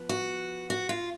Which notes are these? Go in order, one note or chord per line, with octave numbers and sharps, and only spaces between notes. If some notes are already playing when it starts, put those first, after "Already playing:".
Already playing: F3 B3
F#4
F#4
F4